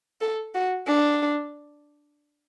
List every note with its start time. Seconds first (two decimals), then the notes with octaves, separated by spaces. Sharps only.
0.21 A4
0.54 F#4
0.87 D4